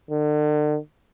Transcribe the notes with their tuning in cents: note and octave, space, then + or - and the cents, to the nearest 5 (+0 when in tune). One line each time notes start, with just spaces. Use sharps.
D3 +40